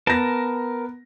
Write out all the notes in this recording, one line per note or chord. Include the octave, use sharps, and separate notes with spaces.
B3 A#4 A5 A#6